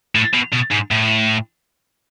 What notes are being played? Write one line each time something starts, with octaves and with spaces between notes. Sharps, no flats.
A2
B2
B2
G#2
A2